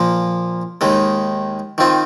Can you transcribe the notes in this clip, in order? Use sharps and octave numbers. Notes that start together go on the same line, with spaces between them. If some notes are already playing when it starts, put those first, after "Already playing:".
Already playing: A#2 F3 A#3
D#2 D#3 G#3
D#3 C4 F4